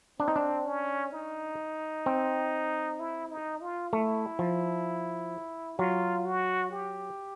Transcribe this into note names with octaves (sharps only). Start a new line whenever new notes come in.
C4 D4
D#4
D4
C#4
D#4
C4
E4
D#4
F4
A3 E4
F3
F#3 F4
F#4
G4